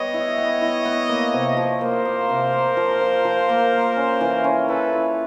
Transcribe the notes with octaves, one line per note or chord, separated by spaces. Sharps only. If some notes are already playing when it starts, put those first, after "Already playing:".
Already playing: G3 B3 C#5 D#5
E4
B3
E4
B3
A#3
C3
F3
A#3 A#4 C5
A#3
C3
A#3
F3
F3
F3
A#3
A#3
C#4
E3
C#4
E3 A4 B4
F4